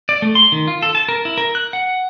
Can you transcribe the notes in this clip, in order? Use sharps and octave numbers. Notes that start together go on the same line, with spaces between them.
D5
A3
C6
D#3
F4
A4
A5
A#4
E4
A#4
F#6
F#5